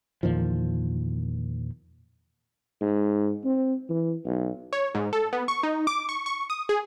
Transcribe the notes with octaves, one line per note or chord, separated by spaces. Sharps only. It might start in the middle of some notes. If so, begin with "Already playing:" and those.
E2 A#2 D#3 F3
G#2
C4
E3
B1
C#5
G#2
A4
B3
C#6
D#4
D6
C#6
C#6
D#6
G#4